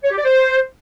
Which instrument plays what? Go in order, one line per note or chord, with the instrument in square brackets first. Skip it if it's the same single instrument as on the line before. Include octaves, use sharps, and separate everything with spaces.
[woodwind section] C#5
G4
D5
C5